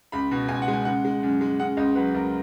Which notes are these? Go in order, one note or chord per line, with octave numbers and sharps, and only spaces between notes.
C#2 B5
B2
C#2 G#5
F#5
G#3
G#5
C#3 F#5
G#3
F#2
G#3
C#3 F#5
C#2 D#5
F#3 B4
C#2 A#4